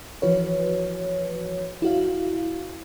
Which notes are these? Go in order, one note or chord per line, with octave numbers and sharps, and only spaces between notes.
E3 F3 F#4 B4 C#5
E4 F#4 F5